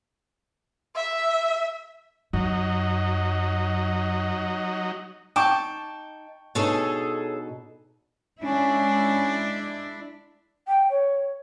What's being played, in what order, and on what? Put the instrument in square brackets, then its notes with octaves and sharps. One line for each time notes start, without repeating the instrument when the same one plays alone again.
[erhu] E5
[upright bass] F#2 [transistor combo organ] F#3 D#4
[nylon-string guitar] D#4 [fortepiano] G5 C#6 D6 [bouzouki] A5
[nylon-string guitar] B2 D4 D#4 [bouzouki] G#4 A4 C#5
[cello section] G#3 D4 E4 [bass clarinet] C#4
[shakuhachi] G5
C#5